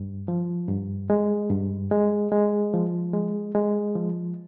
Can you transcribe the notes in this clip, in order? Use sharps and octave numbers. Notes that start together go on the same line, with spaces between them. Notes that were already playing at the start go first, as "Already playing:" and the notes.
Already playing: G2
F3
G2
G#3
G2
G#3
G#3
F3
G#3
G#3
F3